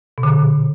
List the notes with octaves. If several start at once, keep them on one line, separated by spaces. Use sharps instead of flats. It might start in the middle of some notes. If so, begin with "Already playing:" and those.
B2
D3
A#2